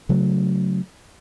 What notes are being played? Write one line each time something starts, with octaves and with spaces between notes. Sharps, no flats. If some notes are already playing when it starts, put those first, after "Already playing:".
C#3 F#3 A3